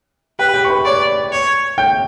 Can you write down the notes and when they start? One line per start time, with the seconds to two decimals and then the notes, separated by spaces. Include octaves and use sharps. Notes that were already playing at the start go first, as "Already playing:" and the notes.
0.39 G4 B4 G5
0.54 G4 G5
0.65 C#6
0.70 B4 B5
0.85 C#5 D5 C#6
1.32 C#5
1.78 G5 G6